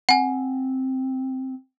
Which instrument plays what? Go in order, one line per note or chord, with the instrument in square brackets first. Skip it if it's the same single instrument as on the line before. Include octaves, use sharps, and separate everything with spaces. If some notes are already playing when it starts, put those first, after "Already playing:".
[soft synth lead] C4 [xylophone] F#5 G#5